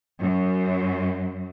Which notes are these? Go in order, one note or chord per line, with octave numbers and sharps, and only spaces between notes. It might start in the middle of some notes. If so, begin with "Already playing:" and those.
F#2